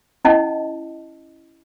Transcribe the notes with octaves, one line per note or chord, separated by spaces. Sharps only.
C#4 E4 D#5 F#5 A5